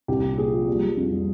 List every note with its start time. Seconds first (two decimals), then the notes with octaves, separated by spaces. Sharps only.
0.08 C2 G4
0.23 A#2
0.38 A#2 G#4
0.53 F3
0.67 G3
0.83 G3
0.97 F2
1.12 G3